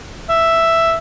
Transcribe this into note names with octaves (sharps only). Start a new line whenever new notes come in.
E5